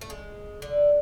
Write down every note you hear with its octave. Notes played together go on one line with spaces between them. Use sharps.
A3
G#3
D3